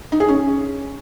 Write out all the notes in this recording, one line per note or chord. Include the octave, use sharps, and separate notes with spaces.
D#4
G#4
C#4